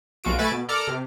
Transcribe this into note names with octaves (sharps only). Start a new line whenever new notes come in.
B1 F4 F#4 D7
A3 B4 G#5 E6 A6 D7
B2
A4 A#4 D5 A#5 D6 F6
C3